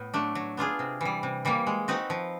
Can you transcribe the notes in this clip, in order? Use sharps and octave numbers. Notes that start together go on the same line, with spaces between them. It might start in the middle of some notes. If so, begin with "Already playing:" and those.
Already playing: A2 B3
F#3 A3 D4
F#3
B3 D4 F4 G#4
C3
E3 G3
C3
E3 G3 A#3
G#3
C4 D#4 F#4 B4
F3